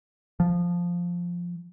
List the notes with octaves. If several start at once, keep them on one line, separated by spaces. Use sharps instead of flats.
F3